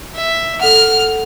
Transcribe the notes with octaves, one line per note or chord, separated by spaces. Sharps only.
E5
A4 F#5 F6